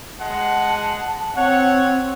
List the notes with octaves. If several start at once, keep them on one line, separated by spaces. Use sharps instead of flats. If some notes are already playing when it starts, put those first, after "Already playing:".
G#3 F#5 A5
C4 C#5 F#5